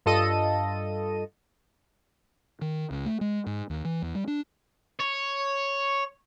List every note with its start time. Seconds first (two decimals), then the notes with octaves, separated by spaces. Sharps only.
0.06 G2 F4 A4 D#5 D#7
2.61 D#3
2.91 C#2
3.06 A3
3.21 G#3
3.46 G#2
3.70 D#2
3.85 E3
4.02 E2
4.15 G3
4.27 D4
5.00 C#5